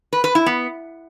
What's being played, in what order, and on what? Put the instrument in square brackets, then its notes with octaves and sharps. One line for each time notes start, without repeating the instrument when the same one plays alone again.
[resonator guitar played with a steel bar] B4
B4
E4
B3